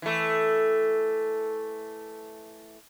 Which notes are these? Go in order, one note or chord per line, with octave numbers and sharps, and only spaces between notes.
E3 A3